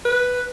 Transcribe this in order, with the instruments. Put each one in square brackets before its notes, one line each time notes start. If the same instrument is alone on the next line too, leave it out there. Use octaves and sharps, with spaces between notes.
[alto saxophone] B4